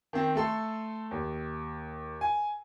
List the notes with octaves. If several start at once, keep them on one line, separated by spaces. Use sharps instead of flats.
D#3 C4
A3 A4 C6
D#2
G#5